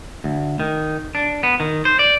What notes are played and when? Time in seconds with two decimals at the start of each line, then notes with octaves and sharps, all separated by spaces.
0.24 D2
0.60 D#3
1.15 D4
1.43 B3
1.60 D#3
1.85 C5
1.99 D5